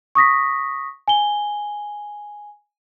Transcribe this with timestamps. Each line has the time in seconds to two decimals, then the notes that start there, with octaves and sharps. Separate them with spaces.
0.15 C#6 D#6 A#6 B6
1.08 G#5 G7